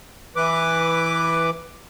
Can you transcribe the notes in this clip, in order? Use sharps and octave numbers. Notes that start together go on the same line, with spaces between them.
E3 B4 D6